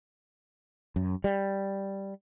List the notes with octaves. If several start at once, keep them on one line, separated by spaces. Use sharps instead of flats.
F#2
G3